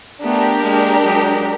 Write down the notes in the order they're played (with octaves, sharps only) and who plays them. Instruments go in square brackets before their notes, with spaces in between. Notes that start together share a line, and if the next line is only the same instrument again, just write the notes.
[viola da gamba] A3 B3 [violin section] D4 G4 A#4
[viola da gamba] G#3 A#3
F#3 G#3